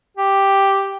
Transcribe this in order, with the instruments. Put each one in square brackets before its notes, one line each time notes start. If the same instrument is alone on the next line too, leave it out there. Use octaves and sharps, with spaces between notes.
[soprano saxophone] G4